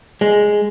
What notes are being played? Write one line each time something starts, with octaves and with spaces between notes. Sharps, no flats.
G#3